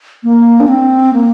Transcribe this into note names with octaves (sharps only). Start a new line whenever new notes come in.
A#3
D4
C4
A#3